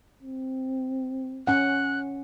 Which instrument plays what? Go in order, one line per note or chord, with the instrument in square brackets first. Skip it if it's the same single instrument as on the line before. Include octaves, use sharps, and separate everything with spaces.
[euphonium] C4
[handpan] C#4 F#5 [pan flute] F#6